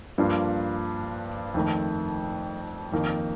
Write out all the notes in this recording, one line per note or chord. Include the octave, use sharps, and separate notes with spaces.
G2 F3 A#3 D4 F4
F2 D#3 A3
F2 D#3 A#3 D#4